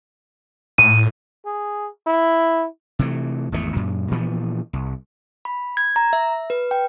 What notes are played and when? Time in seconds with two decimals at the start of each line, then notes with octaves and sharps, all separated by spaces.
0.78 A2 D#7
1.45 G#4
2.07 E4
2.99 C3 E3 A3
3.52 G#1 E2 C3 A3
3.76 F#2 A#2
4.11 A#2 E3 F3 B3
4.73 C2
5.45 B5
5.77 G#6
5.96 A#5
6.13 E5
6.50 B4
6.71 G5